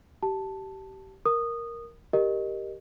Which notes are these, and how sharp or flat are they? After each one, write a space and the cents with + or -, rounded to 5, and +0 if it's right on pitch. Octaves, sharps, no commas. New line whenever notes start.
G4 -25 A5 +0
A#4 +0 D#6 -15
G4 +0 A#4 +0 D#5 -20